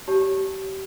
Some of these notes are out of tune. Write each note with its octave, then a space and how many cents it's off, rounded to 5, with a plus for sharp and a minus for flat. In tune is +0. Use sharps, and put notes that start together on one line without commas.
G4 -30 C#5 +0 A5 -10